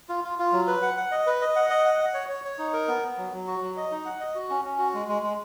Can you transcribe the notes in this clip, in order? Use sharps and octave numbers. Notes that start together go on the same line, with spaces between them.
F4
F4
F4
F#3
B4
F#5
F#5
D#5
B4
D#5
F#5
D#5
F#5
F#5
C#5
C#5
C#5
D#4
A#4
B3
B3
F#3
F#3
F#4
F#3
D#5
D#4
F#5
D#5
F#4
C#4
C#4
F#4
G#3
G#3
G#3